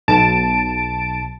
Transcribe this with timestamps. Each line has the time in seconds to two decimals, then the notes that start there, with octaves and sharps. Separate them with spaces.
0.08 B1 A5 D7